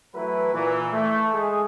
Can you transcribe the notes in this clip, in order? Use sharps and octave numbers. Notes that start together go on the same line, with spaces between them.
E3 F#3 A3 E4 B4
A#2 E3
A3
G#3 G#4